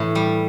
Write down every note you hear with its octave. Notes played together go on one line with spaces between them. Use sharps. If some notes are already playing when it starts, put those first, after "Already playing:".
Already playing: A2 E3
G3